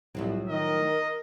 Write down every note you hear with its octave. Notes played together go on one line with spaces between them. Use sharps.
C2 A2 F3 F#3
D#3 A#4 D#5